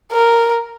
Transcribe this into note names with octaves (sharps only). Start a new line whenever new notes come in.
A#4